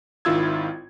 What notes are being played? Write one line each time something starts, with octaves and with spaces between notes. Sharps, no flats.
G#1 D#3 E4 F4 E6 G#6